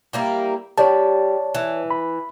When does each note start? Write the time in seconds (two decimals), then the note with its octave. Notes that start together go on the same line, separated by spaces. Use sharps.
0.13 G3 A#3 E4
0.78 G3 C#5 D5 A5
1.55 E3
1.91 B5